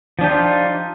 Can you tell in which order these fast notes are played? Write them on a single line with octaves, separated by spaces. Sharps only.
F3 D4 G4 D#4 F4